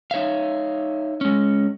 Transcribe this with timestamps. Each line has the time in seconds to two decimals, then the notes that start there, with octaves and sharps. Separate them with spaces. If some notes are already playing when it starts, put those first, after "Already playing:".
0.11 D#4 C#5 E5 F5
1.21 G#3 C#4